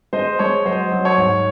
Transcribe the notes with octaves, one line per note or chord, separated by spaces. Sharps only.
G#3 C5 D#5
G#3 C#5
F#3 C5 D#5
F#3
C#5
G#2